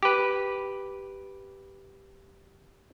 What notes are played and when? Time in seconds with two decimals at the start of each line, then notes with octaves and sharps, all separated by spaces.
0.03 G4 B4